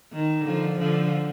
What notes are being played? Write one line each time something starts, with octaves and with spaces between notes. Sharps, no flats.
D#3
D3 F3
D3 F3